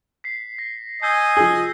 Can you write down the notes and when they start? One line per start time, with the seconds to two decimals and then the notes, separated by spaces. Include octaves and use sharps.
0.24 B6 C7
0.59 A#6
1.02 D#5 G#5 E6 G6 C7
1.37 F3 G#4